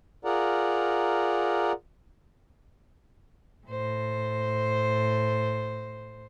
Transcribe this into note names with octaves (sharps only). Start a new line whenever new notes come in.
F4 G#4 A#4 D5 F#5 A#5
A2 C5